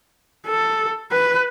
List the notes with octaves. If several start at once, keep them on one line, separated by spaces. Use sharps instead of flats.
A4
B4